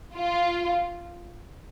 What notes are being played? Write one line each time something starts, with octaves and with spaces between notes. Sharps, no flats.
F4